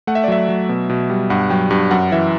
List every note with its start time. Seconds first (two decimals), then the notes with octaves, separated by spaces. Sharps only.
0.07 A3 F#5
0.15 E5
0.24 D5
0.28 F#3 E5
0.49 F#3
0.69 B2
0.90 B2
1.10 G3
1.30 G2 F#5
1.50 F#3 G5
1.71 G2
1.91 F#2 F#5
2.12 E3 E5